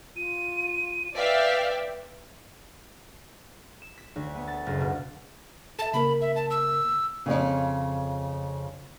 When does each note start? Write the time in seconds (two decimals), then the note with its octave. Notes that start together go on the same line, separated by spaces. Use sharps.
0.16 F4 D#7
1.16 B4 D5 E5 F5 G5
3.82 E7
3.98 B6
4.16 D2
4.35 B3
4.47 A6
4.66 F#1
4.80 B2
5.79 A4 E5 A5
5.94 C#3 A#3 A#4 B5
6.21 E5
6.36 A5
6.51 E6
7.26 F2 A#2 C#3